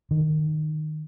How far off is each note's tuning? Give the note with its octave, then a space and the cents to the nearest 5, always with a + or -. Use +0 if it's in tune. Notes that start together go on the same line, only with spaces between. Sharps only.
D#3 -15